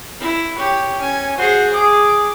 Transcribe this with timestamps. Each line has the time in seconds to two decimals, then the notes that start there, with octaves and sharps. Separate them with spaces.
0.21 E4
0.56 G4 C#5
1.01 C#4 G#5
1.38 F#4 G#4 C5
1.73 G#4 D6